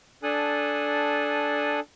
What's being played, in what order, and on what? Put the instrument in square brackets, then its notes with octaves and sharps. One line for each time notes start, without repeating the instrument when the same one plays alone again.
[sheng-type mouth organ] D4 A4 G#5 D#6 F#6